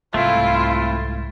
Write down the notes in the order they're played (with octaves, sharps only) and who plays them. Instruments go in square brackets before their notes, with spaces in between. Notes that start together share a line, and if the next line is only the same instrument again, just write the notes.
[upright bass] C2 G#2 [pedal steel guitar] A3 C4 E4 [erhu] F4